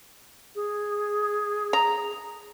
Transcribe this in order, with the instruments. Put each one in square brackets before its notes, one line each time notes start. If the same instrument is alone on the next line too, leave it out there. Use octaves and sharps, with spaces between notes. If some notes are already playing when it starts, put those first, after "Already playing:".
[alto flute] G#4
[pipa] A#5